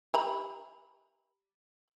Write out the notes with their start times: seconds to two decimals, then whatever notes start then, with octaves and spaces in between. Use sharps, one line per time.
0.14 G4 A#5 B5